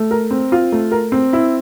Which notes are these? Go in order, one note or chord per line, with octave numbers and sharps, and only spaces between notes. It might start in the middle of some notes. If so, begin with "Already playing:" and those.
Already playing: A3
A#4
C4
F4
A3
A#4
C4
E4